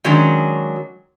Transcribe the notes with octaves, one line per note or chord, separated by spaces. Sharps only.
D#3 F#3 G#3 C#4 D4